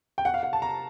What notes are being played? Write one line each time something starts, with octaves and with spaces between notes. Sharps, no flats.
G5
F#5
F5
F#5
A5
A#5